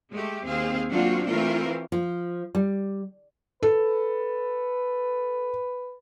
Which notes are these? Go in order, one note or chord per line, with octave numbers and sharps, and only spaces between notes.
G#3 A3 G4
D#2 C4 G#4 F5
F#3 A#3 C4 D4 F4 F#4
E3 A3 C4 F4 A#4
F3
G3
A4 B4